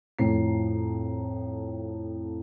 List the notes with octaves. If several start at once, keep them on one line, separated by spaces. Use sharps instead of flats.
F2 A2 F3 A#5 C7